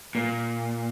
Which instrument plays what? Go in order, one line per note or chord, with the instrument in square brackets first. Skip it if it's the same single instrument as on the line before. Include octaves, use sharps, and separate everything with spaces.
[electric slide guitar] A#2